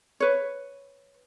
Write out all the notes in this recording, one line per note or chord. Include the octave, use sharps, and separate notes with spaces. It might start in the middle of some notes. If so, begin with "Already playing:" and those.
B4 C#5